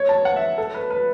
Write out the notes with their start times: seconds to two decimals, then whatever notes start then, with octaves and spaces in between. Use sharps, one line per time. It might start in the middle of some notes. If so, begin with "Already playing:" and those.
Already playing: C#5
0.09 A5
0.25 F#5
0.36 E5
0.58 A4
0.74 B4
0.90 B4